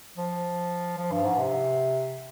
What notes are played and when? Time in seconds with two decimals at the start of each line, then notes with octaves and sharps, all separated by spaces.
0.18 F3
0.98 F3
1.12 G2
1.25 G#2
1.38 C3